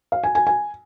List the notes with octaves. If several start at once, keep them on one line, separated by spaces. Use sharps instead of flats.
F5
G#5
G#5
G#5